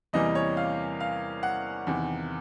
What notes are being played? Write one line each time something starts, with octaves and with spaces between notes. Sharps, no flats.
E2 C3 E3 G3 A#3 D#5
C#5
F5
F5
F#5
E2 C3 D#3